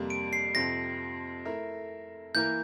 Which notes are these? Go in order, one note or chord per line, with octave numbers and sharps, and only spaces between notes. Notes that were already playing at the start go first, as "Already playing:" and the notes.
Already playing: F2 C3 G3 A#3
D7
C7
F2 C3 F3 C4 A#6
A3 E4 A#4 E5
E3 A#3 E4 A#4 G6